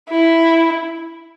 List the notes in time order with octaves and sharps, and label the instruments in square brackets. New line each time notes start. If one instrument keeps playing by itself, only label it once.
[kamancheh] E4